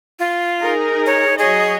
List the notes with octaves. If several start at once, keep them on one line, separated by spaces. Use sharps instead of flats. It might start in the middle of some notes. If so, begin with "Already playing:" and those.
F4
D#4 G#4 A#4
C#5
F#3 G#4 C#5 D#5